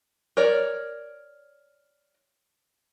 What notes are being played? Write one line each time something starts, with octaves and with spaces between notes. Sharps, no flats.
A#4 C#5 D5